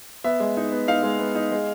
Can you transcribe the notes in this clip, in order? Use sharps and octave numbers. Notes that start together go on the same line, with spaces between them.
B3 E5
G#3
D#4
B3
D#4 F5
G#3
B3
D#4
G#3